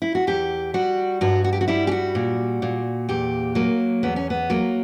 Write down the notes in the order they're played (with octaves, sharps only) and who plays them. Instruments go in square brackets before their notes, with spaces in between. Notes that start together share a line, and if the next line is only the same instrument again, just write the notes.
[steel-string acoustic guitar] E4
F#4
E2 G4
G3 F#4
G2 F#4
F#4
G4
F#4
G3 E4
G4
F#4
A#2
A#2
E2 G4
F#3 A#3
E2 B3
C#4
B3
F#3 A#3